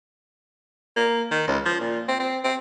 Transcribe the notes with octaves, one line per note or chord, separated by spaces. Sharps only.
A#3
D#3
C#2
F3
A#2
C4
C4
C4